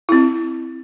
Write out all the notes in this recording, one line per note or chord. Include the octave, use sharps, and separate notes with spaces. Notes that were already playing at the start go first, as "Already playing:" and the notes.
C4 E4